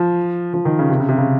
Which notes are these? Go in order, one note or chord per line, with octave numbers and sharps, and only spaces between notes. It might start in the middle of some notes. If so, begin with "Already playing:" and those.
Already playing: F3
F3
D#3
C#3
C3
C#3
C3
C#3